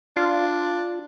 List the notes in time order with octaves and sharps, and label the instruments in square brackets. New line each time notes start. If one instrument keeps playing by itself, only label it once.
[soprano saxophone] D4 [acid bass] F4